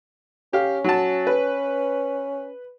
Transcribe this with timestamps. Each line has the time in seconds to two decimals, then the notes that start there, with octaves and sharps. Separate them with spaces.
0.53 C#4 G4 F5
0.84 F#3 A5
1.27 B4